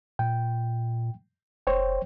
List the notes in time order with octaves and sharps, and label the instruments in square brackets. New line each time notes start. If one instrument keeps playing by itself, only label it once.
[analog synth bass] A#2 [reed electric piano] G5
[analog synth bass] F1 [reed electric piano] C5 C#5 G5